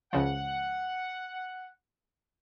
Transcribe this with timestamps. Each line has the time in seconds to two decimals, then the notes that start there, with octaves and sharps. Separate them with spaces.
0.13 C#2 C#3 F3 F#5